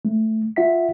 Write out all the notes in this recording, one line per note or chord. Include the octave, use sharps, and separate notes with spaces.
A3
F4 E5 F#5 B6